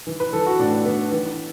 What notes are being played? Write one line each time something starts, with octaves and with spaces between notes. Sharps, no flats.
E3
B4
E3 A4
F#4
A2 D4
E3 B3
E3